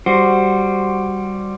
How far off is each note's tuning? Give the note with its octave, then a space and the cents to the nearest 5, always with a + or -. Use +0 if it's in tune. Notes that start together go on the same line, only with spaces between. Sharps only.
G3 +0 F#4 +0 C5 +0